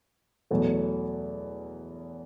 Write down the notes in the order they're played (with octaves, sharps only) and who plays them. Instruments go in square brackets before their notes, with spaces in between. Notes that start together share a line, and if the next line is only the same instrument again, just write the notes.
[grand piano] E2 B2 F#3 A3